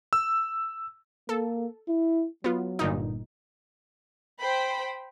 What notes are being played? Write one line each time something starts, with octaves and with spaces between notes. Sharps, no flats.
E6
A#3 A4
E4
F#3 B3 F4
G1 A#2 D#4
C5 G5 B5